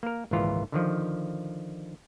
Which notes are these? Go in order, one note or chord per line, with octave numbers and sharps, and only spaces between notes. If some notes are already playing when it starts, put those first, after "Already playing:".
A#3 A#4
G#1 C#2 A#2 E3 F4 A#5
D3 D#3 F3